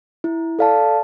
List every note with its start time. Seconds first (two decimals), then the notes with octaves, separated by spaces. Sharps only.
0.24 E4
0.59 A4 D5 F5 A5